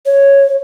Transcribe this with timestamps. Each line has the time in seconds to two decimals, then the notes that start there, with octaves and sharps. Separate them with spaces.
0.06 C#5